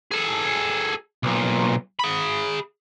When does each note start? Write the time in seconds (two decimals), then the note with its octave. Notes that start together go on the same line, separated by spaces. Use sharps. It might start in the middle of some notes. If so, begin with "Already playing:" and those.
0.11 G#4 A4
1.23 B1 A#2
1.99 G#4 B5